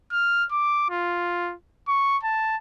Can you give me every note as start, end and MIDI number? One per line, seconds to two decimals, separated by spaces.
0.12 0.46 89
0.52 0.89 86
0.90 1.55 65
1.88 2.17 85
2.23 2.57 81